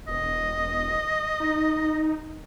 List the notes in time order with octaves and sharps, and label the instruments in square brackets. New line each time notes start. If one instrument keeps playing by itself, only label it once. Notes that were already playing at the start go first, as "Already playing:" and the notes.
[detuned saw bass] E1 [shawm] D#5
[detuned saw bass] D#4